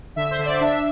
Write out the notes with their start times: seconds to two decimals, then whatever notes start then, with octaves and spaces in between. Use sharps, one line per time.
0.16 D3 E5
0.31 C5
0.39 D3
0.46 D5
0.61 D4 E5